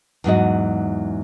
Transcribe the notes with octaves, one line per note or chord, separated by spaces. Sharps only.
E2 G#2 F#3 D#5